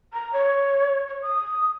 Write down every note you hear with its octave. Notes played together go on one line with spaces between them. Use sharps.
A#5
C#5
C#5
D#6